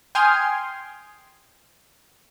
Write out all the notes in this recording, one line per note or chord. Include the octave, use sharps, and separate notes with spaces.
G5 G#5 C6 D#6 F6 G#6